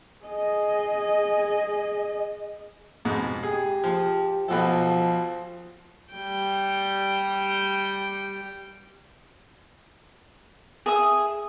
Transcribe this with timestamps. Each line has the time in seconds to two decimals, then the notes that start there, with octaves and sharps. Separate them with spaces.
0.24 G#4 D#5
3.05 F2 G#2 B2
3.43 G4 G#4
3.84 F3
4.48 B1 B2 F3 A4
6.14 G3 G5
10.86 G#4 E5 D#6